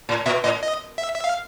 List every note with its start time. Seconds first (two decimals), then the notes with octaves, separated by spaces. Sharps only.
0.09 A2
0.26 A#2 E5
0.44 A2 D#5
0.63 D#5
0.98 E5
1.15 E5
1.24 F5